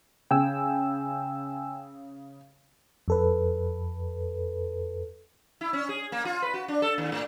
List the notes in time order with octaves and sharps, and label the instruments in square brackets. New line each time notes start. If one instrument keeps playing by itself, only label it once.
[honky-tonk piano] C#3 [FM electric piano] G5 G#5 E6
[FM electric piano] F2 A4 B4
[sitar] E4
C#4
G#4
A#3
F4
B4
F#4
D4
A4
D#2
A2